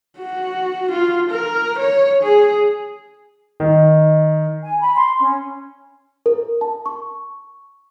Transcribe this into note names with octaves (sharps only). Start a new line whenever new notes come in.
F#4
F4
A#4
C#5
G#4
D#3
G#5
B5
C6
C#4
A#4
A5
C#6